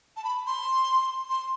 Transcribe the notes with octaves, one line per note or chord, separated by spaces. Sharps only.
A5
B5
C6
C6